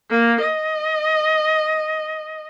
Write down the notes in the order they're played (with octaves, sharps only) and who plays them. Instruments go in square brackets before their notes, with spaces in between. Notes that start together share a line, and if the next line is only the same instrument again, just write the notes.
[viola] A#3
D#5